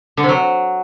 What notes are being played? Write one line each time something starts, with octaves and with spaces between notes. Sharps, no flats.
D3
C3
F#3